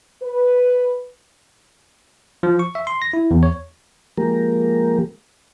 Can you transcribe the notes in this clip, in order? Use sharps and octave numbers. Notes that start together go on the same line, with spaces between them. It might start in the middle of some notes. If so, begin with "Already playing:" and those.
B4
F3
C#6
E5
C6
A#6
E4
E2
C#5
F3 G#3 A#3 G4 A#4